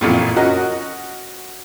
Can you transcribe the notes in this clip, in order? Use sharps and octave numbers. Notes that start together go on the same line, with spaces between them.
A1 F2 A#2
C#4 F#4 A#4 D#5